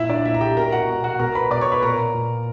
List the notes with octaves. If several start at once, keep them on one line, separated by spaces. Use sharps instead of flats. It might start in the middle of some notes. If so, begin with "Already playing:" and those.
Already playing: A#2 E4 E5
D4 D5
A#2 E4 E5
A#5
G4 G5
B2 A#4 A#5
F#4 F#5
B2
F#4 F#5
B2 A#4 A#5
B4 B5
B2 D5 D6
C#5 C#6
B4 B5
A#2 A#4 A#5
A#2